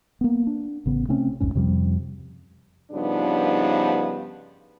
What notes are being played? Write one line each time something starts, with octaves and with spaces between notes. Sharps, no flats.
A#3 B3
D4
A1 C#3 B3
C3 A3 C4 C#4
B1 F2 G#2 C#4
F2 C3 F3 G3
G2 C#3 F3 B3 D4 D#4